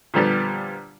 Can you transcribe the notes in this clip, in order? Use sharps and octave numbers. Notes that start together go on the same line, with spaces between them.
A#2 D3 F3 G3 B3 G4